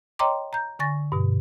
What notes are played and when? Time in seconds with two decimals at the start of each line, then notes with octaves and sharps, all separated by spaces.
0.19 C#5 D#5 G5 A#5 C6 D6
0.53 A#5 G6
0.79 D3 G#5 C#6 A6 A#6
1.12 G2 B2